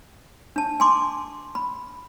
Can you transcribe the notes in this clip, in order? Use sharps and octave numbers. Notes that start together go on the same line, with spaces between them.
D4 A5
G#5 C6 D6
B5